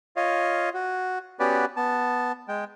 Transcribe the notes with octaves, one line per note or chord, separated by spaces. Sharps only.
F4 C#5 D#5 F5
F#4
B3 C#4 F#4 G4 B4 D5
B3 A5
G#3 G5